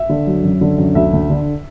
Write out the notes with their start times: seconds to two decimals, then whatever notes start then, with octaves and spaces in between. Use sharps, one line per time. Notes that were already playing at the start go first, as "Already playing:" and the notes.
Already playing: E5
0.09 D3
0.27 F#3
0.44 F#2
0.61 D3
0.78 F#2
0.95 D2 E5
1.13 D2
1.30 D3